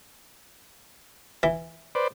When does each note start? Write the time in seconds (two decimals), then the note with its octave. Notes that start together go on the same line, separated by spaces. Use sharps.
1.43 E3
1.95 B4 C5 D5